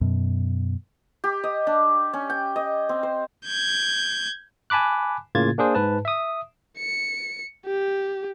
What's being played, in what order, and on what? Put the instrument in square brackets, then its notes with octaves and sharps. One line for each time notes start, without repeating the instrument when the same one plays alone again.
[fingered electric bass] F#2 B2
[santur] G4
D#5
D4
C#4
G5
D#5
C4
C5
[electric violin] G6 G#6
[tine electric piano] G#5 A5 B5 D6 F#6
A2 C#3 A#3 F4 G#6 A6
A#3 D4 G#4 C5
G#2 B4 A5
E5 D#6
[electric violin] C#7
G4